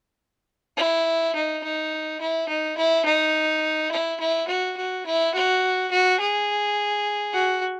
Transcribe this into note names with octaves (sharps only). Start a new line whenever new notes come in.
E4
D#4
D#4
E4
D#4
E4
D#4
E4
E4
F#4
F#4
E4
F#4
F#4
G#4
F#4